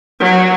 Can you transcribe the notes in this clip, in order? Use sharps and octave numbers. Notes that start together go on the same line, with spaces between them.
F#3